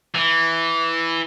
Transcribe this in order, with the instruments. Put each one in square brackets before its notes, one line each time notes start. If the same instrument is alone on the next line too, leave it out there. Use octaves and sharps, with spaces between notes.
[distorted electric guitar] E3